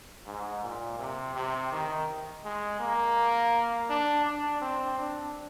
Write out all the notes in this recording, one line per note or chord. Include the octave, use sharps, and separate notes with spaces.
G#2
A#2
C3
C3
D#3
G#3
A#3
D4
D4
C4
D4